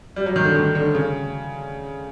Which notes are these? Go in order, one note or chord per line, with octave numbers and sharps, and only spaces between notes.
G3
F#3
D#3
D3
D#3
D3
C#3